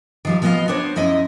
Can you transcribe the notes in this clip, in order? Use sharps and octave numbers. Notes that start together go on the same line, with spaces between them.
D#3 F3 G3
F3 B3 F4 A#4 D#5 F5
B3 D4 C5 C#5
F#2 F3 E4 D#5